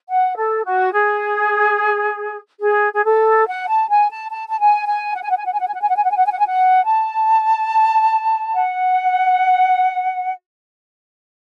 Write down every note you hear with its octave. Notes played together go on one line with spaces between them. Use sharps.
F#5
A4
F#4
G#4
G#4
G#4
A4
F#5
A5
G#5
A5
A5
A5
G#5
G#5
F#5
G#5
F#5
G#5
F#5
G#5
F#5
G#5
F#5
G#5
F#5
G#5
F#5
G#5
F#5
G#5
F#5
G#5
F#5
A5
F#5